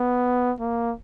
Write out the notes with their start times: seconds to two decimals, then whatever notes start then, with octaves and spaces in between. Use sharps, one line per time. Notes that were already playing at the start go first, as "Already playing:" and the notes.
Already playing: B3
0.60 A#3